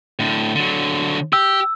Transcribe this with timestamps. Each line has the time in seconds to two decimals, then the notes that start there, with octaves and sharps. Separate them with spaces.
0.19 A2 D3
0.55 D3 F#3
1.33 G4 E6